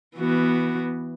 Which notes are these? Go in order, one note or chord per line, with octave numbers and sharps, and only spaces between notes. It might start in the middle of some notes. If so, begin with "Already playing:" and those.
E3 B3 F#4